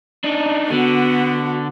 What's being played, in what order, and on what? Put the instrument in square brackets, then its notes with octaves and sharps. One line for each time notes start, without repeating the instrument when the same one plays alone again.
[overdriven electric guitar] D4 D#4
[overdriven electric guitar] D3 [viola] B3 F#4